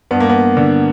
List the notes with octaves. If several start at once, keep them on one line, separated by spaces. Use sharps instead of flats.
G2 B3
A#3
B3
D3